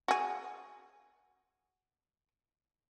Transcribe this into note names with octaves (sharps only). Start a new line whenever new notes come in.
F#4 G#4